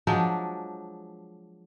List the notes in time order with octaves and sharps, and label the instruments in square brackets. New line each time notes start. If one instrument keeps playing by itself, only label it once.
[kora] F3 F#3 G#3 D4